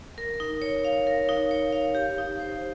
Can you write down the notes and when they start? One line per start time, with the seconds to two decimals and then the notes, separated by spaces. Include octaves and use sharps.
0.18 A#4
0.40 D#4
0.62 C#5
0.84 F5
1.07 A#4
1.29 D#4
1.51 C#5
1.72 F5
1.95 G4
2.18 D#4
2.39 C5